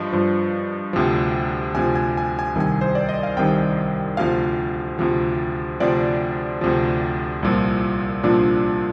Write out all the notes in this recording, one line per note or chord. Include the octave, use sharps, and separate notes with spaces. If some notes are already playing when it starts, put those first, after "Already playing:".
Already playing: G2 F3 D#5
G2 F3
D2 C3 F3
D2 C3 F3 G#5
G#5
G#5
G#5
C2 C3 D#3 G#5
C5
D5
D#5
F5
C2 C3 D#3 G5
D2 C3 F3 F5
D2 C3 F3
D2 C3 F3 D5
D2 C3 F3
C2 A#2 F3
C2 A#2 F3 D4